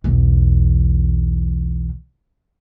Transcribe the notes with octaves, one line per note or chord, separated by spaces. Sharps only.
B1 E2